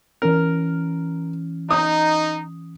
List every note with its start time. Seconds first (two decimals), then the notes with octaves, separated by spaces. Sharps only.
0.22 E3 C#4 A#4 F6
1.71 D#4 D#6